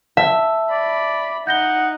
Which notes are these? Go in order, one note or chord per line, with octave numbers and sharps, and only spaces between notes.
E5 A5
D5 B5
D#4 F#5 G6 A#6 G7